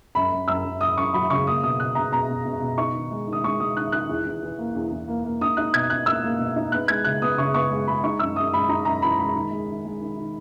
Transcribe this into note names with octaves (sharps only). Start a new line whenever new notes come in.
F#2 B5
F#2
F#2 E6
F#2
F#2 D#6
F#2 C#6
F#3 B5
C#3 C#6
A#3 D#6
B2 D#6
B2 F#6
B2 A#5
B2 A#5
B2
B2
B2
D#4 C#6
D#3
G#3
D#3 D#6
G#3 C#6
G#3 D#6
D#3 F#6
D#3 F#6
E2
E2
E3
A#3
E2
E2
A#3
A#3
D#4 D#6
D#4 F#6
B2 G#6
B2 F#6
A#3 E6
A#3
B2
D#4
B3 F#6
G#3 G#6
C#3 F#6
B3 D#6
C#3 C#6
B3 C#6
G#3
G#3 B5
D#4 C#6
F#2 E6
F#2 D#6
G#3 B5
D#4 A#5
F#2 A#5
E3 B5
G#3 B5
D#3
G#3
D#3
G#3
D#3
D#3